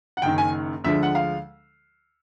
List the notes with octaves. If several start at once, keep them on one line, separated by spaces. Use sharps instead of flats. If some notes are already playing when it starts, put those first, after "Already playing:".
F#5
F#1 F#2 D#3 G5
G#5
D2 D3 F3 G#3 E5
F#5
F5